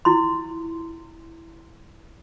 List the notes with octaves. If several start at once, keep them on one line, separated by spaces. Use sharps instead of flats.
E4 C6